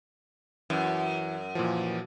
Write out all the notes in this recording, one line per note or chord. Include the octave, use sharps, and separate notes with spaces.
F#2 E3
A#2 E3 F3